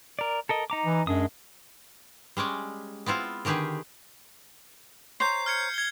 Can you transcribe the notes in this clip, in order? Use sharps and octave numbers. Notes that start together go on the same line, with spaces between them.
A#4 D5
A4 A#4 D#5
D#4 A#5 D6
E3
F#2 G#3 D4 D#6
G3 G#3 C#4 D5
B3 C4 E4 F4
D3 D#3 G4 G#4 B4
C5 C#5 A#5 G6 C7
F6 G#6 C#7
G#6 G7